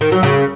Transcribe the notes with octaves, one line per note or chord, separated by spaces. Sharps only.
D#3
F#3
C#3